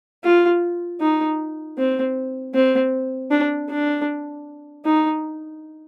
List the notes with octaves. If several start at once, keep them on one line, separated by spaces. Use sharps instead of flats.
F4
D#4
C4
C4
D4
D4
D#4